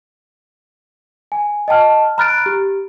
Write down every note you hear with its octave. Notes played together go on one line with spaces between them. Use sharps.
G#5
D#5 G5 A5 F6
A#5 B5 F6 F#6 A6 D7
G4